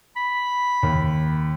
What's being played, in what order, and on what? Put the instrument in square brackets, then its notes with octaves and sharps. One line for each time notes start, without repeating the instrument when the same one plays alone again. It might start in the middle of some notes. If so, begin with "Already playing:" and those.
[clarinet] B5
[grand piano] D#2